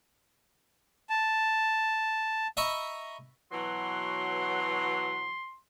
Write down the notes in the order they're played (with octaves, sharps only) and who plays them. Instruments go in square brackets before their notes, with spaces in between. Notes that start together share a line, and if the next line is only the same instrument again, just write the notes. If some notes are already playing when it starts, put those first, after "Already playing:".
[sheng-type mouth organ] A5
[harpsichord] D#5 E5 A#5 B5 C#6
[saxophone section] B2 E3 F#3 [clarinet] C6